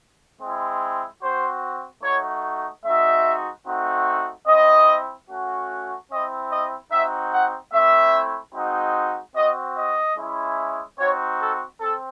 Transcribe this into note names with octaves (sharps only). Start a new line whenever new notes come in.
G#3 C4 E4
C4 F#4 C5
A3 D#4 F#4 C#5
G#3 C4 D#4 F#4 E5
A3 C4 D#4 F#4
C4 E4 D#5
A3 C#4 F#4
C4 E4 D#5
D#5
C4 D#4 F#4 E5
F#5
A3 C4 E4 E5
G#3 C4 D#4 F#4
C4 F#4 D#5
D#5
G#3 C#4 E4
C4 D#4 F#4 C#5
A4
C4 A4